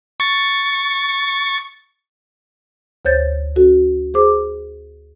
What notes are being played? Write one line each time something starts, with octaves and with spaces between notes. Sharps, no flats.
C#6 A6
D2 C5 C#5 G6 A6
C#4 F#4 A4
G#4 C5 D6